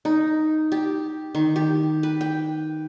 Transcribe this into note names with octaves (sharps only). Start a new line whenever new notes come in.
D#4
G4
D#3
G4
B4
G5